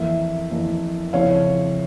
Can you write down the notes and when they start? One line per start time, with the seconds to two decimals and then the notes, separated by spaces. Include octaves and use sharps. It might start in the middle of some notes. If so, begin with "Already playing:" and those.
Already playing: F2 E3 A#3 E5
0.51 F2 E3 A#3
1.13 F2 C#3 F3 C4 E4 C#5 F5